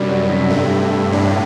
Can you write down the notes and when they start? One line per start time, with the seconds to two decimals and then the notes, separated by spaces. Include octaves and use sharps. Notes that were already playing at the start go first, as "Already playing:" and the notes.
Already playing: F#2 C3 G3 D4
0.09 F#4
0.29 C3
0.50 G2 A3
0.70 A3
0.91 A4
1.11 A2 D4